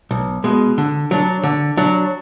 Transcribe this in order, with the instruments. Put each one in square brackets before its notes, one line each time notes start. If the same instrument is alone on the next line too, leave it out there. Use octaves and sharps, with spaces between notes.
[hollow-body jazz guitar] B1
B2 G#3
D3
F#3 D4
D3
F#3 D4